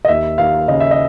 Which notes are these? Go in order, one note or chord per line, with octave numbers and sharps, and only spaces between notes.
D#5
D#2 E5
D#2 F5
C#3 D#5
E5
D#5